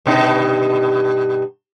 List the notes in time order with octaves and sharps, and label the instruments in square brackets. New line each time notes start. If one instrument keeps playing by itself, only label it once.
[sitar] G2 B2 D#4